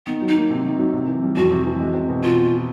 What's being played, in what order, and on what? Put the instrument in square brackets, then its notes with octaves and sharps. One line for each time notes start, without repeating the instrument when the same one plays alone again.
[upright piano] D#3 [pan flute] B3
[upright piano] F#3
[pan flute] D#4
[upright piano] A#3
C3
D#3
F#3
C3
E3
G3
[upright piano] F2 [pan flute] F#4
[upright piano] C3
E3
G#3
C4
B2
[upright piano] B2 [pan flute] F4